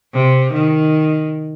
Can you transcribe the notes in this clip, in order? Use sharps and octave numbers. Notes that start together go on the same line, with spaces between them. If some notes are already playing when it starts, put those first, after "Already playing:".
C3
D#3